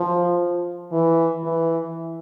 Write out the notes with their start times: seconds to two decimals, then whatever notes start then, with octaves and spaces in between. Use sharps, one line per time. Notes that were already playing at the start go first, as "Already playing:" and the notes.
Already playing: F3
0.92 E3
1.44 E3